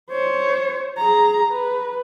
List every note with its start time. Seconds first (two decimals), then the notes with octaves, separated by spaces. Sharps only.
0.11 C5 C#5
0.98 G#4 A#5
1.52 B4